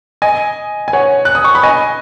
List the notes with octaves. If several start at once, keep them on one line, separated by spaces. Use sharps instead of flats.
D#5 G#5
G#5
C#5 F#5
F#6
D#6
C#6
B5
D#5 G#5